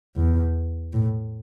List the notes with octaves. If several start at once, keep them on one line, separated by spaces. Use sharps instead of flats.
E2
A2